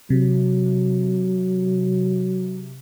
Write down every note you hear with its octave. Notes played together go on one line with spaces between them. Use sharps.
C3 F#3